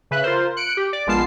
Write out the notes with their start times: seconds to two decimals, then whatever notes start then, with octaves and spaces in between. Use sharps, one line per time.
0.11 C#3 B4 E5 F#6
0.24 F4 A#4 C5
0.56 F#6 C#7 D7
0.77 G4
0.93 D5
1.07 A#1 G#3 B3 F4 A5 C7